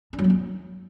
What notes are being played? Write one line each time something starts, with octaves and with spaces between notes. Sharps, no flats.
D4
F#3
A#3
D#4